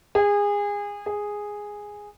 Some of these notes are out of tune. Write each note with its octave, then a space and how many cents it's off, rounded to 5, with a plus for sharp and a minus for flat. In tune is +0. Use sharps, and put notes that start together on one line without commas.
G#4 -25
G#4 -5